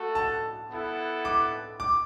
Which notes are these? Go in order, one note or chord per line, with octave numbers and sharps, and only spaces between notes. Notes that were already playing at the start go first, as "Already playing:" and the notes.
Already playing: A3 F#4 A4
A5
B3 E4 A4 F#5
D6
D6